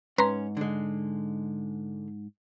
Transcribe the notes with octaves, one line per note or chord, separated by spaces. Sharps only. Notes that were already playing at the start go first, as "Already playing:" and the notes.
G#2 C#4 B4 A#5 C6
D3 G#3